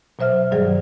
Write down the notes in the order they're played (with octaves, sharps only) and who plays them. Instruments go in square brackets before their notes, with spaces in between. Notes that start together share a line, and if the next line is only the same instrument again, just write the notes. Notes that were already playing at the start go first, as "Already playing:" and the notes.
[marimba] B2 F#3 C5 E5 F6
G2 D#3 F#3 G3 G#4 D5